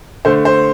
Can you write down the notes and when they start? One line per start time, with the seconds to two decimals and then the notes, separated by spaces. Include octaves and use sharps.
0.25 D3 A3 C5
0.45 C5